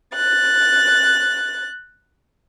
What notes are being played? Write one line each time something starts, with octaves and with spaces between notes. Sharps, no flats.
F#6 A6